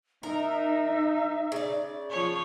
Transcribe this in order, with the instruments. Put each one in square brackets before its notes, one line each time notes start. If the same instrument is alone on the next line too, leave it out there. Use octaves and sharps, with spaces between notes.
[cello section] D#4 [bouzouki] A#4 [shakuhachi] E5
[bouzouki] C#3 D5
[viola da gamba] F3 C#5